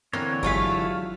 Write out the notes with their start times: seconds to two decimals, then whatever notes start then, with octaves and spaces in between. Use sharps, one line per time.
0.13 D3 E3 A#3 C4 C#5
0.43 G1 F#3 G#3 A3 F4 F5 B6